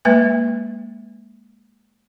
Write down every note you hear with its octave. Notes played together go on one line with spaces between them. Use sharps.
G#3 A#3 B4 E5 G#5